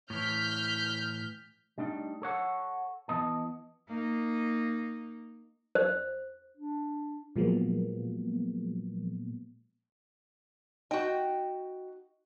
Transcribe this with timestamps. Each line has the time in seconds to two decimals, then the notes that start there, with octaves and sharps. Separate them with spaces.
0.10 A2 E3 F6 G6 B6
1.78 G3 A3 D4 D#4
2.22 A4 C#5 F#5
3.08 E3 B3 D#5 A5
3.88 A#3 D#4
5.75 C5
6.57 D4
7.36 A#2 F3 F#3 G#3 A#3 B3
10.91 D#4 F#4 G5